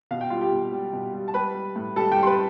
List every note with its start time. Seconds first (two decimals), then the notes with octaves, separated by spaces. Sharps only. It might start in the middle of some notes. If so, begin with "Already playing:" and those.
0.11 B2 F5
0.21 G5
0.30 G3 F4 F5
0.41 G4 G5
0.52 B2
0.72 G3
0.93 B2
1.14 G3
1.28 A5
1.34 G3 B4 B5
1.55 G3
1.76 A2
1.96 G3 A4 A5
2.12 G4 G5
2.17 G3
2.23 C6
2.27 B4 B5